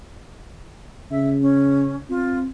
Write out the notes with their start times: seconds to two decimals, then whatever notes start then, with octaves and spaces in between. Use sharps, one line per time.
1.11 C#3 E5
1.41 C#4
2.09 C4 F4